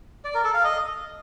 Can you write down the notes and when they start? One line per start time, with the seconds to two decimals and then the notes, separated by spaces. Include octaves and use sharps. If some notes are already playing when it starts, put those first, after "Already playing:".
0.25 D5
0.34 A#4
0.44 A4
0.54 F5
0.64 D#5